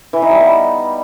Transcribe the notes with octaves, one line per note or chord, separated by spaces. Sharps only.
E3
D#4
G3
B3